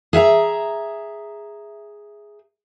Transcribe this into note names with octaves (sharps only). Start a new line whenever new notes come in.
G#4 E5 F5 A#5